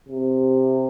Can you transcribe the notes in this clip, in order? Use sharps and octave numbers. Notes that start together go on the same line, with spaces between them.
C3